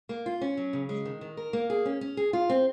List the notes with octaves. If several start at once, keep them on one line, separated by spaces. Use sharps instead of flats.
A#3
F4
C#4
F#3
C#3
G#3
D#3
D#3
A#4
A#3
G#4
C#4
C#4
G#4
F4
C4